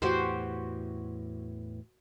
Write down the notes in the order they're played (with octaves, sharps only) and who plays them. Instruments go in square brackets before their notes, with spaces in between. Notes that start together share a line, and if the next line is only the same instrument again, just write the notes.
[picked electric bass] E2 A2 E3 [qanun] F#4 G4 C5